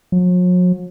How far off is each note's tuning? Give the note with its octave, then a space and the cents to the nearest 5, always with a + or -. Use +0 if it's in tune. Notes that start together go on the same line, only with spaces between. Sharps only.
F#3 -45